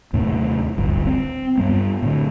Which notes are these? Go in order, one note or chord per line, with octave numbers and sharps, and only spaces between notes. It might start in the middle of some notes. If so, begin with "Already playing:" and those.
D#2 A2 C3
D1 G1 G2
C4
G2 G3 B3
A2 D3